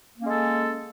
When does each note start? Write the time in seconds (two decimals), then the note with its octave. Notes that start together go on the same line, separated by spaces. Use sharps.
0.17 A#3
0.21 C#4
0.25 G#3
0.29 A4